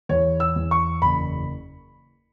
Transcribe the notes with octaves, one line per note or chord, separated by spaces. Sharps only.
E2 C#5
E6
E2
C#6
F#1 B5